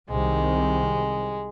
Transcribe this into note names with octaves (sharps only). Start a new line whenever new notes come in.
C2 C3 D#3 G#3